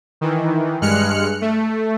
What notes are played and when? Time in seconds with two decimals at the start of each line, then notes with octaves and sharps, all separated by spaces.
0.21 D#3 E3
0.81 G2 G#3 F6 F#6 C#7
1.41 A3